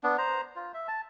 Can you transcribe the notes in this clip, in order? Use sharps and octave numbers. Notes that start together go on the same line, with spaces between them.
B3 D4
C5 A#5
F4
E5
A5